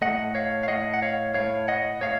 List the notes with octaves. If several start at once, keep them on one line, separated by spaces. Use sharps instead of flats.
A2 A3 D#5 F#5
C#5 F5
F5
A2 A3 D#5 F#5
F#5
C#5 F5
A2 A3 C#5 F5
D#5 F#5
A2 A3 C#5 F5